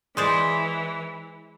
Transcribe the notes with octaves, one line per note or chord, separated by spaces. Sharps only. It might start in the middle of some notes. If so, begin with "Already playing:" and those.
E3 G#3 C5 D5